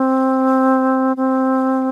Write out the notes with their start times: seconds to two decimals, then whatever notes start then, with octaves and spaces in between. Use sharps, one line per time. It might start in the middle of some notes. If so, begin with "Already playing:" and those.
Already playing: C4
1.17 C4